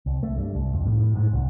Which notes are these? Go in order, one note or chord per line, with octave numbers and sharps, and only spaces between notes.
C2
A3
G2
C2
F2
A2
A2
G#2
C2